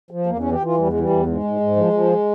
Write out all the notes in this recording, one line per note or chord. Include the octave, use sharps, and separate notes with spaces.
F3
E2 A#3
E3 C#4
G4
E3 F4
E2 G3
G#3
E3
G3
E2
G#2 G#3
G#2
G#2
F3
F3